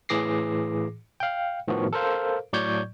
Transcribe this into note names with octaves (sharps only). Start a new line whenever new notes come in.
A2 E3 G#4 D6 A#6 C7
F5 G5
A2 D#3 F3 B3 F#4
A4 A#4 C5 F5
A2 F#3 D5 C#6 G6 G#6